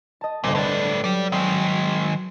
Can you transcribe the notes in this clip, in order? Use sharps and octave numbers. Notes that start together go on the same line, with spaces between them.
D#5 A5
G1 C2 A#2
A2 B4 D5 G5
F#3 G4 D5
D#3 G#3 E6